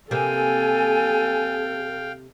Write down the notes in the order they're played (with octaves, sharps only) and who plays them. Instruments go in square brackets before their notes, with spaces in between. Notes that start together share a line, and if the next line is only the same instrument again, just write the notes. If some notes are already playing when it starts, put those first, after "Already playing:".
[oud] C3 A#3 [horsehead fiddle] A4 [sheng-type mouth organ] F5 G5 [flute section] G#5